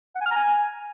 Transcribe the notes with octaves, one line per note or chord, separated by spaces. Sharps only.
F#5
G#5
F6
A#5
G#5